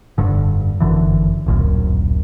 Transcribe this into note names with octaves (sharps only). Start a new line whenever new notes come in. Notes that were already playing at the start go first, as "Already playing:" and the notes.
F1 G2 D3
G1 F#2 D3 E3
D1 A#1 F#2